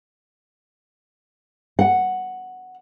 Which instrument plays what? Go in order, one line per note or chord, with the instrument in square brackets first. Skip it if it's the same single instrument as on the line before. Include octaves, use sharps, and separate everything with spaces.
[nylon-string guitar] F#5